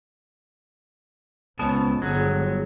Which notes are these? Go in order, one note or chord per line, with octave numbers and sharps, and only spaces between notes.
C#2 G2 G#3 B3 C4 C#5 A5
G1 F#3 G#3 G#4